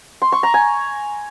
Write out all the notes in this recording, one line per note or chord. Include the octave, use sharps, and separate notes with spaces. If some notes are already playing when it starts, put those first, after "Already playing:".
C6
C#6
A#5
G#5